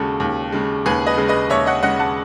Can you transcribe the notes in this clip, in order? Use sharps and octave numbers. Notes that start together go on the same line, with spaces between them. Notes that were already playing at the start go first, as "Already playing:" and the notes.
Already playing: D#2 C#3 G#3 F#4 A4
D#2
C#3 G#3
D#2 G#4 B4
B4 D#5
C#3 G#3
B4 D#5
D#2 C#5 E5
D#5 F#5
C#3 G#3 D#5 F#5
F#5 A5